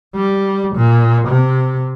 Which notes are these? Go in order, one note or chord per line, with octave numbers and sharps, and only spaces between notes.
G3
A#2
C3